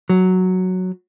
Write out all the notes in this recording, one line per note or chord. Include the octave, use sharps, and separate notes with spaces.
F#3